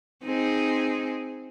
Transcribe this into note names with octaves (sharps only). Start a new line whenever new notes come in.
C4 D#4 G#4